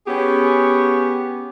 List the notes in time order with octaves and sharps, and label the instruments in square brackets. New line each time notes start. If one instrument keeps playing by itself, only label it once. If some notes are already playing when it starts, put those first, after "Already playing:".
[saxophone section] B3 C#4 G4 G#4